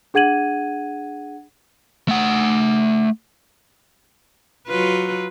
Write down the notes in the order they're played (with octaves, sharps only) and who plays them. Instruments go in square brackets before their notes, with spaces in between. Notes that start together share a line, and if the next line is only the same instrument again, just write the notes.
[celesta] D4 G#4 F#5 G#6 D#7 F#7
[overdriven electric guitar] A3 F#5
[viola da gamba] F#3 F4 B4